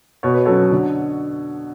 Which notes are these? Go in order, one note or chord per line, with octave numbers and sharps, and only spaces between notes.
B2 C#5
B4
F#3 C#4 A4 C#5
D3